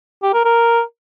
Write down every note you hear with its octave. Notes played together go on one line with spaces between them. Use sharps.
G4
A#4
A#4